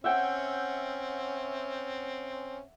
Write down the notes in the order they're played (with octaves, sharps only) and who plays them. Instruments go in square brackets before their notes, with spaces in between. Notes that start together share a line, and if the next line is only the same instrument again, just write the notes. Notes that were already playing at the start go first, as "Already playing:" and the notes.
[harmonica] C4 C#4 [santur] E5 F#5 G5